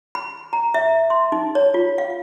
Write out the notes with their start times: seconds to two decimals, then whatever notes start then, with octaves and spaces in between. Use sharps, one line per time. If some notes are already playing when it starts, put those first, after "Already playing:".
0.15 B5
0.53 A#5
0.74 E5
1.10 C6
1.32 D#4
1.55 C#5
1.74 F4
1.98 F5